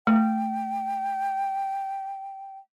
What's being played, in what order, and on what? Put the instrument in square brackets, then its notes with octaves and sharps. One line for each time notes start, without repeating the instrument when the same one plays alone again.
[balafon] A3 [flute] G5